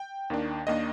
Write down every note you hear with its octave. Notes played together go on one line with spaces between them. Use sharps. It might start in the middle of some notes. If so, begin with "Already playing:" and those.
Already playing: G5
D#2 D#3 A#3 D4
D#2 D#3 A#3 D4 D#5